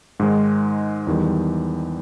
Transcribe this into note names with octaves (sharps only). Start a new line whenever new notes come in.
G#2 D#3 G#3
E2 D#3 G3